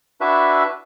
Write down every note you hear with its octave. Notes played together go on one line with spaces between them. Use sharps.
D4 E4 F#4 B4 E5